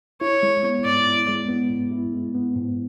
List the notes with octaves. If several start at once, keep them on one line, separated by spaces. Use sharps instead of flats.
E4 C#5
G#3
B3
G#2 D5
E4
G#3
B3
G#2
E4
G#3
B3
G#2